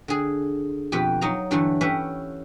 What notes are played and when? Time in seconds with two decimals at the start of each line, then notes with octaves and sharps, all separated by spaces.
0.08 D3 G#4
0.92 F2 B2 G4 B4 B5
1.21 F#3 D#4 D#5 F5 A#5
1.51 G2 D3 E3 F#3 A3
1.81 C#4 G4 B4 E5 F#5